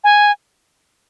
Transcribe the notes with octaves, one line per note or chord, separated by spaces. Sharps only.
G#5